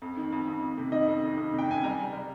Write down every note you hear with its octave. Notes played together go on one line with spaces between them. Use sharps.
F2
D#3
F2
F2
F2
C3
D#3 D#5
F2
D#3
F2
C3
G5
C3 G#5
G3 A#5
G3
G3